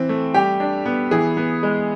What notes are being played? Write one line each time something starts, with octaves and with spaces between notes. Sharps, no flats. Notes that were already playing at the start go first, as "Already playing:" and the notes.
Already playing: E3 C4
A3
G3 G4
D4
B3
E3 G#4
B3
G#3